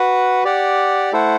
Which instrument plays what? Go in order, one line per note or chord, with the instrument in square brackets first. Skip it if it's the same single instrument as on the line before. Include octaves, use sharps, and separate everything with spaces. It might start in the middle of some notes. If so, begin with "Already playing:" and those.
Already playing: [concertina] F#4 B4 F#5
G4 D5 F#5
A3 E4 A4 C5 F#5